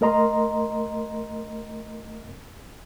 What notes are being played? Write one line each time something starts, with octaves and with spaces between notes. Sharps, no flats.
A3 A#4 D#5 A#5 C6